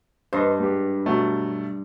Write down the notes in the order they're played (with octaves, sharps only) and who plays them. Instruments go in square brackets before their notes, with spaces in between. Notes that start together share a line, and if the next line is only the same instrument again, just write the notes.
[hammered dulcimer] G2 [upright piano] C5 D#5
[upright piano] G#2 G4
B2 F#3 A3